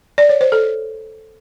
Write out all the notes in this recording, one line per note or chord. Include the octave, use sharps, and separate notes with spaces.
D5
C#5
C5
A4